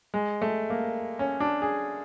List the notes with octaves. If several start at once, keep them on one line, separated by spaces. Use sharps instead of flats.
G#3
A3
A#3
C#4
D4
G#4